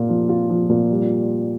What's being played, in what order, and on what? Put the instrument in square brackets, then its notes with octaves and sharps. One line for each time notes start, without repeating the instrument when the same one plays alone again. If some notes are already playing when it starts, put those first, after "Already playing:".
Already playing: [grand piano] A#2 F4
F3
F4
F3
A#2
G3